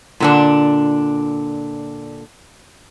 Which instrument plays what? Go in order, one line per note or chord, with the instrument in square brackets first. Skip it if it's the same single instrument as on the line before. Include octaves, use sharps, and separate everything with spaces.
[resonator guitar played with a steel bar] A#2 D3 D4